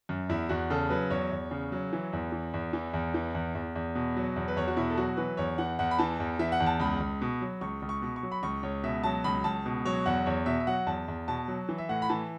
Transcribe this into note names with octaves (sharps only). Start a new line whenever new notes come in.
F#2
E2 E4
E2 F#4
C#3 A4
F#3 B4
E2 C#5
E2
C#3
F#3
E3
E2
E3
E2
E3
E2
E3
E2
E2
E2
B2
F#3
E2
B4
E2 C#5
F#4
B2 E4
A4
F#3 F#4
E3 B4
E2 C#5
E3 F#5
E2 F#5
B5
E3 A5
E2
E3 E5
F#5
E2
A5
C#2 B5
C#2
B2
F#3
C#2 C#6
C#2
C#6
B2
C#6
F#3
B5
C#2 C#6
C#2 C#5
B2 E5
F#3 A5
C#2 B5
C#2 A5
B2
F#3 C#5
E2 F#5
E2 C#5
B2 E5
E5
F#3 F#5
E2 A5
E2
B2 A5
F#3
E3
E5
A2 F#5
B5
E3 A5